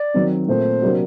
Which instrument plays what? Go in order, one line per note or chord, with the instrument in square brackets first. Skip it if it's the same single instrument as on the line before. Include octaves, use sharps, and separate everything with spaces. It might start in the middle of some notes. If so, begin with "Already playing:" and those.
Already playing: [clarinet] D5
[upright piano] D#3 F#3 C4
[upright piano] A#2 A3 C4 [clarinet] C5
[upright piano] C3 F#3 A#3 D4 F#4